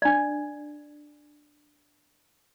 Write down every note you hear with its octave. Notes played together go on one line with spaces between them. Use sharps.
D4 D5